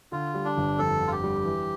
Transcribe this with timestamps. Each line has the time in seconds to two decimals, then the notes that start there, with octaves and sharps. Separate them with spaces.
0.12 D3 F4
0.34 G3
0.45 D4
0.57 G1
0.79 F2 A4
1.01 D3
1.07 F4
1.12 G4
1.23 G3
1.45 E3